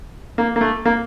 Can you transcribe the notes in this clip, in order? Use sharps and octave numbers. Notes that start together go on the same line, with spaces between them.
A#3
A#3
A3
A#3